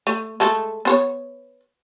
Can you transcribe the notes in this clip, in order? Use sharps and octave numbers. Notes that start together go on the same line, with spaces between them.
A3
G#3 A3 A4
B3 C5 C#5